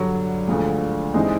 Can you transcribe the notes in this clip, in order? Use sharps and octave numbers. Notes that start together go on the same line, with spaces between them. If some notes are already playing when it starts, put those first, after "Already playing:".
Already playing: G2 D3 F#3
D2 D3 F3 G#3
G2 E3 G#3 C4 D#4